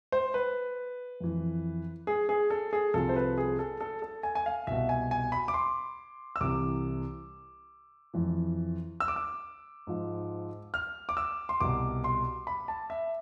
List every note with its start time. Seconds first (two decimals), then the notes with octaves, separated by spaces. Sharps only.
0.12 C5
0.34 B4
1.21 F2 E3
2.07 G#4
2.29 G#4
2.50 A4
2.73 G#4
2.94 C2 C3 F3 A4
3.09 C5
3.16 B4
3.38 G#4
3.59 A4
3.81 A4
4.02 A4
4.23 G#5
4.35 G#5
4.46 F5
4.67 C2 B2 E5
4.89 G#5
5.11 G#5
5.32 B5
5.48 D6
5.54 C6
6.36 E6
6.41 C2 C3 E3 D6
8.14 F2 E3
9.00 E6
9.08 D6
9.16 E6
9.87 G#2 F3
10.74 F6
11.09 D6
11.17 E6
11.49 C6
11.60 C2 B2 D6
12.04 C6
12.47 B5
12.68 A5
12.90 E5